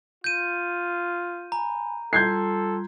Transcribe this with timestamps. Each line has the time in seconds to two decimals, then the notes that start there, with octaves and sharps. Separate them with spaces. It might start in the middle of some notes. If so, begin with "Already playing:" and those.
0.24 F4 G6 D#7
1.52 G#5 A#5 B5
2.13 G3 F4 A4 C6 G6 G#6 C7